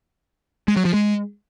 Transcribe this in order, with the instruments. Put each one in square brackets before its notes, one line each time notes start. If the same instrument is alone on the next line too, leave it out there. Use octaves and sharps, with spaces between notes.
[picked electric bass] G#3
F#3
F3
G#3